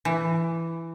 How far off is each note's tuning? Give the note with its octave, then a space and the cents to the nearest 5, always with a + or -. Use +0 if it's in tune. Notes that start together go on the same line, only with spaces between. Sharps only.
E3 +10